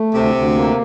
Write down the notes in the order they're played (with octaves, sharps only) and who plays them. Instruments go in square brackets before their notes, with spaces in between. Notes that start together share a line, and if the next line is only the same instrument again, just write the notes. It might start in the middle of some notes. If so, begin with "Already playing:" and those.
Already playing: [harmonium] A3
[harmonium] D2 [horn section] C3
[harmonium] D2
A#3